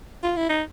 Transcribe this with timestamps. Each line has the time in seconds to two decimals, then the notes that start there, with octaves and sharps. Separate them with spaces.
0.23 F4
0.37 E4
0.49 D#4